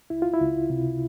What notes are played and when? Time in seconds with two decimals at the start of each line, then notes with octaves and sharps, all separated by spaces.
0.10 C#2 E4
0.22 F4
0.33 E4
0.40 C#2
0.70 C3